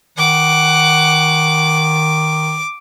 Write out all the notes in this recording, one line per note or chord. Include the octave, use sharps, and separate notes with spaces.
D#3 F#5 D6